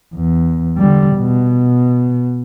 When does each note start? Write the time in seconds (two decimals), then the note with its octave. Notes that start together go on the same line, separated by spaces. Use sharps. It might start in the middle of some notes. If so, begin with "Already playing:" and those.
0.14 E2
0.77 D3 G3
1.17 B2